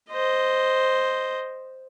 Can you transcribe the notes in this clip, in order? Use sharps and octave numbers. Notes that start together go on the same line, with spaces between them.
C5 D#5